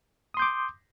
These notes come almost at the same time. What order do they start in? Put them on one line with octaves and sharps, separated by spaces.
D#6 C6 G6 D6